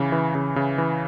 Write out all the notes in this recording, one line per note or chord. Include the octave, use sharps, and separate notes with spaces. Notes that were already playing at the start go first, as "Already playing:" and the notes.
Already playing: C#3 E3
E3
C#3
C#3
E3